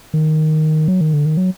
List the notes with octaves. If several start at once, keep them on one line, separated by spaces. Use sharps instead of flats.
D#3
F#3
D#3
D3
D#3
F#3